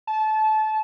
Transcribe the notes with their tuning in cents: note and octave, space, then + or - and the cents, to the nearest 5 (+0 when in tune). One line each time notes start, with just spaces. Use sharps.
A5 -25